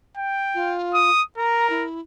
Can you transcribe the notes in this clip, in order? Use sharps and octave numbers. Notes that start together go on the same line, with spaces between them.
G5
F4
D#6
A#4 A#5
E4